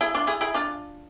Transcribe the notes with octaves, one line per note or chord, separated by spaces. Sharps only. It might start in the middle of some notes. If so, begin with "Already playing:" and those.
E4 G#4
D4 F4
E4 G#4
E4 G#4
D4 F4